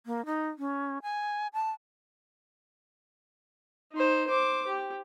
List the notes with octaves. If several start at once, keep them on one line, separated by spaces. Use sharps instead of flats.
A#3
D#4
C#4
G#5
A5
D#4 C5
C5 D6
G4